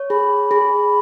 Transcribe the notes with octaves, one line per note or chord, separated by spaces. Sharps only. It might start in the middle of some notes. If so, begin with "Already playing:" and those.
Already playing: C#5
G#4 B5
G#4